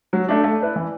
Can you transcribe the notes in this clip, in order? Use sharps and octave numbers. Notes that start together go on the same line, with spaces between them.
F#3
A3 D4
A3
E4 B4 D5
E3